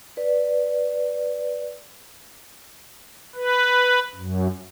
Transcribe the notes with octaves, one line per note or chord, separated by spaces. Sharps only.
B4 D5
B4
F#2